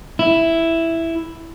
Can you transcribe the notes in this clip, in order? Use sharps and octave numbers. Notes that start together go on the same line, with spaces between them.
E4